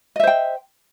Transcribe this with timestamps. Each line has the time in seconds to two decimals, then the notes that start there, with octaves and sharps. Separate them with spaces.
0.16 D#5
0.20 E5
0.24 C5
0.27 G5